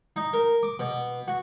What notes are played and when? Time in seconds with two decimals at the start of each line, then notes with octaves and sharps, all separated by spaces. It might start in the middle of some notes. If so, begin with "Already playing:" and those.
0.16 D#4
0.33 A#4
0.63 D6
0.79 B2
1.28 F#4